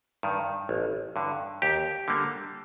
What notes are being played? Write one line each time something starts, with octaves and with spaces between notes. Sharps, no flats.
G2 D#3
A1
G2 D3
D#2 G4
D3 G3 A#3